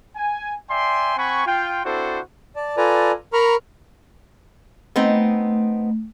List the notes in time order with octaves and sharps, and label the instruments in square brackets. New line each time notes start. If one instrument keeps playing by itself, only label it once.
[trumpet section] G#5
D5 E5 G5 G#5 C6
C4 F#5 G#5 B5 C#6
F4 G5
C4 D4 E4 F#4 A4 C5
[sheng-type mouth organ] D5 A5
F4 A4 B4 D5 G#5 A#5
A#4 A#5 B5 C#6 F6
[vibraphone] A3 [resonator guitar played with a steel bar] B3 C4 D#4